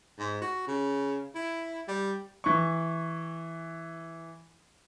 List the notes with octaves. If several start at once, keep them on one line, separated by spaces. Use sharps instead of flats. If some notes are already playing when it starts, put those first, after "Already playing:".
G#2
F#4
C#3
E4
G3
E3 C#6